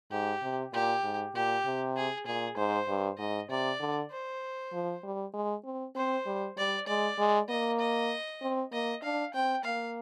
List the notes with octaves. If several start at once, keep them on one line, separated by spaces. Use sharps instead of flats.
G#2 G4
C3
A#2 G4
G#2
A#2 G4
C3
G#4
A#2 G#4
G#2 C5
G2
G#2 D#5
C3 D5
D3
C5
F3
G3
G#3
C4
C4 C5
G3
G3 D5
G#3 D5
G#3
A#3 D#5
D#5
C4
A#3 D#5
D4 F5
C4 G5
A#3 F5